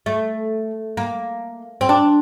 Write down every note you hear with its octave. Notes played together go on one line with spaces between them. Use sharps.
A3
A#3
C4
D4